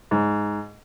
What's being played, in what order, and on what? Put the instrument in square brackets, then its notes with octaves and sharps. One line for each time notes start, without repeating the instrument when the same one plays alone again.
[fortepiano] G#2